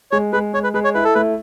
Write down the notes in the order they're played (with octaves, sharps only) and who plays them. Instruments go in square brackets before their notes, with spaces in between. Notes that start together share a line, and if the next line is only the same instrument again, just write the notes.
[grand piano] G#3 [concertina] C#5
[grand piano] G#3 [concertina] B4
[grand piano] G#3 [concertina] C#5
[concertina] B4
[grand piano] G#3 [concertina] B4
[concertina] C#5
[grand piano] E4 [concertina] B4
[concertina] A4
[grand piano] A3 [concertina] B4